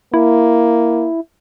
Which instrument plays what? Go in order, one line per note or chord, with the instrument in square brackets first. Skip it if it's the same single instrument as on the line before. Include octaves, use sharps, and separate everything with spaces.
[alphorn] A#3 [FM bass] E4